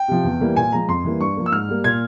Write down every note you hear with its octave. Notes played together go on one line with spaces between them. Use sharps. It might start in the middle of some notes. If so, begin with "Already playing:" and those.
Already playing: G5
C3 F3
E2
E3 G3 A#3
A#2 G#5
F3 G#3 A#5
F2 C6
E3 G3 A#3
G2 C#6
F3 A#3
E6
G#2 F6
G3 A#3
A#2 G#6